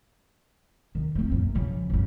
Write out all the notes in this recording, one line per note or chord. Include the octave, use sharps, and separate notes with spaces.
D#3
A3 C4
A#1 F#2
C#3 F3
E2 G2